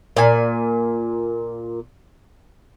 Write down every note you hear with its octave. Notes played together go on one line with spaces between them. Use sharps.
A#2 G#5